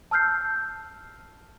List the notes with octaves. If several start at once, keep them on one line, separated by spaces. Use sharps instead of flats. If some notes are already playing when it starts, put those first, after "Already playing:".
A5 E6 F6 G6 C7